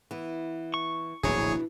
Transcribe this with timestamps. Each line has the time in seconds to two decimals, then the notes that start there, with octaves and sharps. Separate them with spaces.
0.11 E3 B3
0.74 C#6
1.23 D1 A#1 B2 E3 D4 G#4 C#5